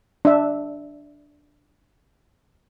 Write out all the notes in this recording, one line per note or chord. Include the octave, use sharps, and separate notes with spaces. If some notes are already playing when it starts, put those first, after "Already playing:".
D4 E5